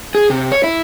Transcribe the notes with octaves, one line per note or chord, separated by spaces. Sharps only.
G#4
C3
C#5
E4